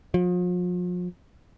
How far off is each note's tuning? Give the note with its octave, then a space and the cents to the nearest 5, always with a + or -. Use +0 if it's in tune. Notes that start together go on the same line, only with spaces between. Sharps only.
F3 +40